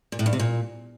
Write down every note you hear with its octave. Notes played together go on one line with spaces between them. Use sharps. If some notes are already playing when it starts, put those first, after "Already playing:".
A#2
A2
G2
C3
A#2